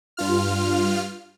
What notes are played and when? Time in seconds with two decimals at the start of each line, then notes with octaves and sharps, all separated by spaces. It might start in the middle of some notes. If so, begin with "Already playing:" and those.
0.17 G2 F4 F6